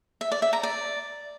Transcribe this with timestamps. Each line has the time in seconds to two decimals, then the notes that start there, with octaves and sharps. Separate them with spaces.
0.21 E5
0.32 D5
0.42 E5
0.53 A#5
0.63 D5